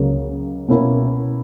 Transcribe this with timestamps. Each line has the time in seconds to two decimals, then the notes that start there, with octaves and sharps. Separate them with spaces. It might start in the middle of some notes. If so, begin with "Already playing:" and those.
Already playing: C#2 C#3 F#3 A#3 C#4
0.68 B2 A#3 C#4 E4